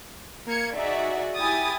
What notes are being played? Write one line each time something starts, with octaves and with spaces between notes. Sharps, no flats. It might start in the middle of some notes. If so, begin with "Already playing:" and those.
A#3 G#6 C#7
D#4 F#4 G#4 D5 E5
E4 G4 G#5 D#6 A6